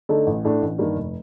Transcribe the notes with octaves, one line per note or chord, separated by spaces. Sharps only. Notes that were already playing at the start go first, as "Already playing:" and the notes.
D3 A3 D#4 A4
A1
A2 A3 D4
A1
G2 D#3 A#3
F1